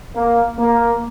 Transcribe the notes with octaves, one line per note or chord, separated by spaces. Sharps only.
A#3
A#3